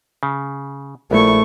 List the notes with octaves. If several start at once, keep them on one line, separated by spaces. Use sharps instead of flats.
C#3
A#1 A3 E4 C#6